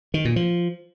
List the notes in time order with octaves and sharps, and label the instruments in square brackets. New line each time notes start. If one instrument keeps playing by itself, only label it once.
[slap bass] D#3
A#2
F3